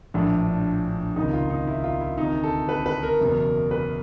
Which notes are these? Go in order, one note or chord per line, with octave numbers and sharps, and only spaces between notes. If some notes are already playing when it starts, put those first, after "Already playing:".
A#1 A2 F3 D4
C#2 C3 D#3 D#4
F4
D#4
E4
F4
E4
D2 C3 D#3 D#4
A4
B4
B4
A#4
F#1 E2 B2
B4